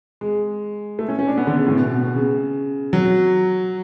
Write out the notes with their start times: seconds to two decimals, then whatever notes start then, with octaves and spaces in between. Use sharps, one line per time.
0.21 G#3
0.99 A3
1.09 C#4
1.19 C#4
1.28 D4
1.38 B3
1.47 D3
1.57 C#3
1.67 A2
1.77 B2
2.15 C#3
2.93 F#3